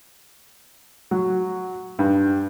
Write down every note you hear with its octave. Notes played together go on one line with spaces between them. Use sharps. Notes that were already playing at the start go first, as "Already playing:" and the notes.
F#3
G2